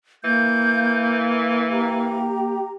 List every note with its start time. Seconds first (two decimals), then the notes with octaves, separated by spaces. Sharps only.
0.24 E3 A#3 G6
1.72 G4 A#5